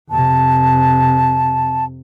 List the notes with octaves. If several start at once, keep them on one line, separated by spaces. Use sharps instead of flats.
F2 C3 A5